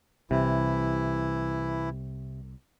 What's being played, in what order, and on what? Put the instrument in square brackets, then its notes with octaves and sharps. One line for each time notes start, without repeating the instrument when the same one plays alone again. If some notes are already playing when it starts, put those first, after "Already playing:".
[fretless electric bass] C2 [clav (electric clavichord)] C3 [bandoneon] E3 E4